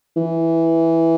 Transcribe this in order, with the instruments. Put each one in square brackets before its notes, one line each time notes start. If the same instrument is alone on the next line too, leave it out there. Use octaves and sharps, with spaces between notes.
[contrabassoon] E3